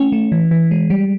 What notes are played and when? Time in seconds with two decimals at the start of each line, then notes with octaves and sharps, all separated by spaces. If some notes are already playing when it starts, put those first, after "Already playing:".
Already playing: A3 C#4
0.12 A3
0.32 E3
0.51 E3
0.71 G#3
0.90 G3